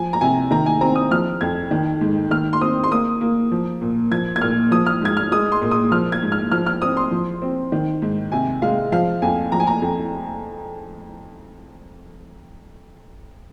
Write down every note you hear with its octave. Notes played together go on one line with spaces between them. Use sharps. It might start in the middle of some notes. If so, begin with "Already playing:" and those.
Already playing: F3 G#5
A#5
C3 G#5
D#3 A#5
G#5
C4 A#5
D#6
F3 F6
F2 G#6
D#3
G#2
D#3 F6
C6
C4 D#6
C6
A#3 D#6
A#3
F3
A#2
F3 G#6
G#6
A#2 F6
F3 D#6
F6
G#2 G#6
F6
G#3 D#6
C6
A#2
D#6
F3 F6
G#6
G#2
F6
F3 F6
F6
C4 D#6
C6
F3
C4
D#3
G#2
C3 G#5
G#3 F5
F3 F5
F2 G#5
F3 A#5
G#5
A#5
F2